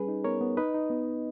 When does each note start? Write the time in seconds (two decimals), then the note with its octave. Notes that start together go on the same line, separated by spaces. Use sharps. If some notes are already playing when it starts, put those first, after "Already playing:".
Already playing: G3 C#4 G#4 B4
0.08 D#4
0.24 B3 A#4 C#5
0.41 B3
0.57 D#4 B4 D#5
0.74 D#4
0.90 B3